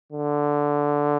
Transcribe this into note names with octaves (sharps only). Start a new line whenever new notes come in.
D3